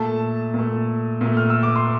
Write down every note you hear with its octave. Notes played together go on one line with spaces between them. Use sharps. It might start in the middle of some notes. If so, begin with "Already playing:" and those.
Already playing: A#2 A3 A5
A#2 A3
A#2 A3
F6
E6
D6
C6